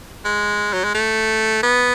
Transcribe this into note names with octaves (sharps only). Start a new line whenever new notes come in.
G#3
F#3
G#3
A3
B3